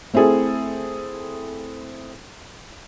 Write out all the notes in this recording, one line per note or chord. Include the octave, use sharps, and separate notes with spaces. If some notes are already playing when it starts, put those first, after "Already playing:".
A3 C4 E4 G#4 A4